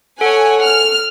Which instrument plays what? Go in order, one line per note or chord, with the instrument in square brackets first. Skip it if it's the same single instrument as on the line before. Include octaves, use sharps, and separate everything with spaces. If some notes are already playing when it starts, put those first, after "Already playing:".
[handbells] A4 [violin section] C#5 F#5 G#5
[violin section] F6